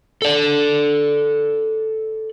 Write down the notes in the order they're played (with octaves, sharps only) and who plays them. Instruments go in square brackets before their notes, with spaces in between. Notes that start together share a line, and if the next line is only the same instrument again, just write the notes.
[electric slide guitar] A4 D5